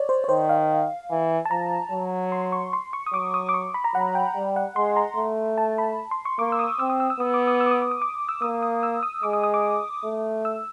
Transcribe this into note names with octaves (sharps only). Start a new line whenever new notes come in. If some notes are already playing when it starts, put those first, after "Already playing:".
Already playing: C#5 D5
C5
C#5
D#3 C5
F5
E3
A5
F3 A#5
F#3
C6
C#6
C6
C#6
D#6
F#3 D6
D#6
D6
C#6
B5
A#5
F#3 F#5
G5
G3
F#5
G#3 C6
A#5
A3
A5
B5
C6
C#6
A#3 D6
E6
D#6
C4 E6
D#6
E6
E6
B3 D#6
D6
D#6
E6
D6
D#6
D6
D#6
D6
E6
A#3 D#6
D#6
E6
D#6
G#3 D6
D#6
D#6
D6
A3
E6